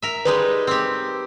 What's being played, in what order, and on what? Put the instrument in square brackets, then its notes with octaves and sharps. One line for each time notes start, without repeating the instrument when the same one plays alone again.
[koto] A#4 E5
[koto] G3 G#3 D#4 [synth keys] B4
[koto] C4 G4